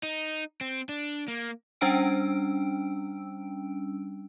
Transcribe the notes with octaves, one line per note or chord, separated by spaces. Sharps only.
D#4
C4
D4
A#3
G3 C#4 D4 G5 E6 D7